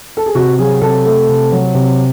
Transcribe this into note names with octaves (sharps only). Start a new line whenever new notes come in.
A4
G#4
C3 F#4
F#3 G#4
C3 A4
A3
C3
F#3
C3